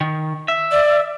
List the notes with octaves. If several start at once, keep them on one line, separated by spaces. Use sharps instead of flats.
D#3
E5
D5